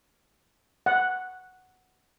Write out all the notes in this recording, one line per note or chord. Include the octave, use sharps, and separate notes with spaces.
F#5